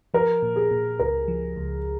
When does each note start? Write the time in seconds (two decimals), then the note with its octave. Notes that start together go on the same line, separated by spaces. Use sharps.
0.14 F3 A#4
0.42 A#2
0.56 G#4
0.71 A#2
0.99 C#2 A#4
1.28 F3
1.56 C#2